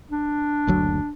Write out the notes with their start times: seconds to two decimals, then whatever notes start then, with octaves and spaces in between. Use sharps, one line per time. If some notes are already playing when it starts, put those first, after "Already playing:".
0.11 D4
0.67 F#1 D2 F#3